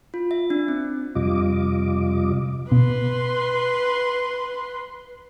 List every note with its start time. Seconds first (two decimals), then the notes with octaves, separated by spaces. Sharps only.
0.14 F4
0.31 E5
0.50 D4
0.68 C4
1.15 F2 C3 G3 F4 D#5 D6
2.72 B2 B4 C6